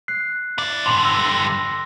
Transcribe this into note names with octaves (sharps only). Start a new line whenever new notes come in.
F#6 C7
E4 D5
G2 D3 C6 F#7
E6 A#6